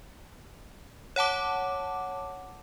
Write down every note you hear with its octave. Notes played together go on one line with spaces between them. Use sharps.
C#5 F#5 A5 D6